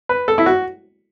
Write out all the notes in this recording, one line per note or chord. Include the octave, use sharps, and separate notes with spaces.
B4
A4
E4
F#4